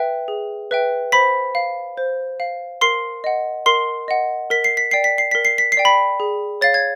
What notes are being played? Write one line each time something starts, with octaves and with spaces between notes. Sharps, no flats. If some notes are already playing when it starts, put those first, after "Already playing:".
Already playing: B4 E5 G5
G#4
B4 E5 G5
C5 B5 B6
F5
C5
F5
A#4 C6 C7
D#5 F#5
A#4 C6 C7
D#5 F#5
A#4 B6
C7
B6
D5 G5 C7
B6
C7
A#4 B6
C7
B6
C7
D5 G5
B5 B6
G#4
C#5 F5 A6
G#6